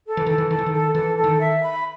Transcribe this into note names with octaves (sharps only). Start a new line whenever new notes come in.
A4
E3
D#3 A4
E3
D#3 A4
E3
D#3
A4
E3 A4
A4
D#3
E5
B5